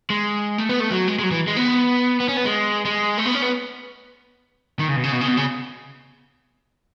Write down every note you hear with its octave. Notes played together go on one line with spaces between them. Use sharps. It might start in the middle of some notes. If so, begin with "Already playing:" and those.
G#3
A3
B3
A3
F#3
G#3
G#3
F#3
E3
G#3
B3
B3
C#4
B3
G#3
G#3
A3
B3
C#4
B3
D#3
C#3
B2
C#3
B2
C#3
B2
C#3